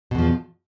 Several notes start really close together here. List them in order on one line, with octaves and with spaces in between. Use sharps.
B2 E2 F3